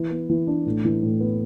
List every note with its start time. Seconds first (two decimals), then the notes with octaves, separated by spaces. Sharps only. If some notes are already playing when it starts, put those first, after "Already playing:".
Already playing: E3
0.10 B3
0.30 E3
0.47 D4
0.66 A2
0.85 E3
1.03 A2
1.20 B3